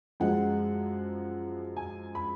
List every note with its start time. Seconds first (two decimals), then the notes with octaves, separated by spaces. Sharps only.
0.20 F#2 F3 G#3 F#5
1.77 G#5
2.15 B5